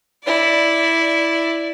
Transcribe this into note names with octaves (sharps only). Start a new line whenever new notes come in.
E4 D5